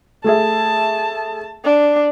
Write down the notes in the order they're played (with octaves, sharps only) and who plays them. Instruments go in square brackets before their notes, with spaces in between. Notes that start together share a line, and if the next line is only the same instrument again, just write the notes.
[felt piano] A3 G#4 E5 [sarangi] A5
[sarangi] D4